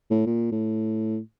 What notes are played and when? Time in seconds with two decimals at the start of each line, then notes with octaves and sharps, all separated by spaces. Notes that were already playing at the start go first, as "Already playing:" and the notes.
0.10 A2
0.26 A#2
0.52 A2